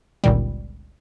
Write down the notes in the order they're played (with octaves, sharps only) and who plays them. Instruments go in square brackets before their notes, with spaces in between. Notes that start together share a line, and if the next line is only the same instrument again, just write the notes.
[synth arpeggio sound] G1 C#2 A#2 D#3 G3